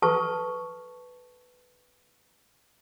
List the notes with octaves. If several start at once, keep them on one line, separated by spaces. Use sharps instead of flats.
A4 B4 A5 C#6